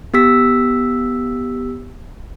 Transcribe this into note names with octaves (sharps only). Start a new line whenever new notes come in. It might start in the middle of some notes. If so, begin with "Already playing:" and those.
B3 G4 E6 B6